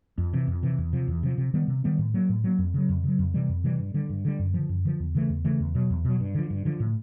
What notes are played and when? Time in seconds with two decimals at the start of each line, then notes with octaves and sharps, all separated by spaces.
0.18 F2
0.33 C3 E3
0.47 F2
0.63 C3 E3
0.78 E2
0.93 C3 F3
1.08 E2
1.23 C3 F3
1.38 C3
1.54 D#3 G3 B3
1.68 C3
1.84 D#3 G3 B3
1.98 A2
2.14 F#3 A#3
2.29 A2
2.44 F#3 A#3
2.58 F2
2.74 C#3 F#3
2.89 F2
3.04 C#3 F#3
3.19 F2
3.34 C3 E3 G3
3.49 F2
3.64 C3 E3 G3
3.79 G2
3.94 D3 G3
4.09 G2
4.25 D3 G3
4.39 F#2
4.54 D3 F3
4.69 F#2
4.85 D3 F3
5.00 E2
5.15 C#3 E3 A3
5.29 E2
5.45 C#3 E3 A3
5.60 E2
5.75 B2 F#3
5.90 E2
6.05 B2 F#3
6.20 G2
6.35 D3 F3
6.50 G2
6.65 D3 F3
6.80 A2